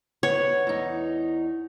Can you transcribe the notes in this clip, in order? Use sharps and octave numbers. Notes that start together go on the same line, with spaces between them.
B3 C#5
E2 D#4